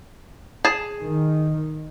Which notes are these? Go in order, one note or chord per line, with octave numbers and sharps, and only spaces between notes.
G#4 A5
D#3